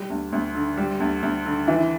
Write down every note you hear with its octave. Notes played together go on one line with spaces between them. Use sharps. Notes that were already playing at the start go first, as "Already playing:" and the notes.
Already playing: G3
D2
D2
D3
G3
D2
D2
D3
E3